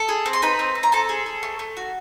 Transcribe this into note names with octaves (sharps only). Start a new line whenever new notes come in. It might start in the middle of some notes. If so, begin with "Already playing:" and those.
Already playing: A4 A5
G#4
C4
C6
D#4 B4 B5
C4
C4
A#5
C4 A4 A5
G#4
G#4
A3
A3
F#4